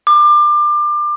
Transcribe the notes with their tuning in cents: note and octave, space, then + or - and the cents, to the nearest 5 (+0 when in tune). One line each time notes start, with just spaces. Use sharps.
D6 +25